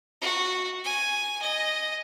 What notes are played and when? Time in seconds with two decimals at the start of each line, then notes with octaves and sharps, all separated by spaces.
0.21 F#4
0.84 G#5
1.42 D#5